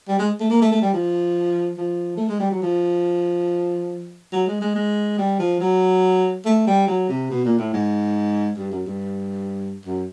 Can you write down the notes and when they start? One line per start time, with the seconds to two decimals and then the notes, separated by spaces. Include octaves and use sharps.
0.08 G3
0.19 G#3
0.40 A3
0.50 A#3
0.62 A3
0.72 A3
0.82 G3
0.93 F3
1.77 F3
2.17 A3
2.28 G#3
2.40 G3
2.51 F#3
2.62 F3
4.33 F#3
4.47 G#3
4.61 G#3
4.75 G#3
5.18 G3
5.39 F3
5.60 F#3
6.45 A3
6.67 G3
6.88 F#3
7.09 C3
7.31 B2
7.45 A#2
7.58 A2
7.73 G#2
8.57 G2
8.71 F#2
8.86 G2
9.85 F#2